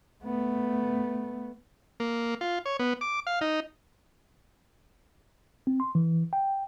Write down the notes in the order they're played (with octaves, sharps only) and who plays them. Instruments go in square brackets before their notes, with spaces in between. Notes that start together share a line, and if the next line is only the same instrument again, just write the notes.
[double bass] A3 B3
[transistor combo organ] A#3
F4
C#5
B3
D6
F5
D#4
[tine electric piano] C4
C6
E3
G5